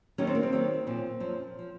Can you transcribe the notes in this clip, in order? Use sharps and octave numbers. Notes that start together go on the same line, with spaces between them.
D#2 D#3 F#3 C#4
C4
A#3
C4
D#2 D#3 F#3
A#2 F3 C4
F#2 F3
F3